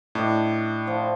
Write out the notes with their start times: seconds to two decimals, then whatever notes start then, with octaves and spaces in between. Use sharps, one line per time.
0.15 A2 D4 D#5
0.87 F3